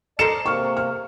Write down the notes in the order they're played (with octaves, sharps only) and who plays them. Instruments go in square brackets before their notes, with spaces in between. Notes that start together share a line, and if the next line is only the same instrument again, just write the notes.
[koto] A4 A#4 C5 [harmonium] D5 D#5 A5 [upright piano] C#7 E7
[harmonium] C3 A#3 [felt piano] C#6 F6
[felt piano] F6